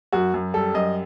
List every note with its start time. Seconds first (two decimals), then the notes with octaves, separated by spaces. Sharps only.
0.12 F#2 F#4
0.34 F#2
0.54 G3 A4
0.74 F#2 D#5